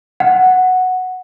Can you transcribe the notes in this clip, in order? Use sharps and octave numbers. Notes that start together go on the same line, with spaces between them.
F#5